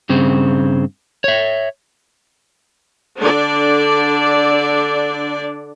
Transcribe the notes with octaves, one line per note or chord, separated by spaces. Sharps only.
G2 C#3 C4
C#5 E5
D3 D4 D5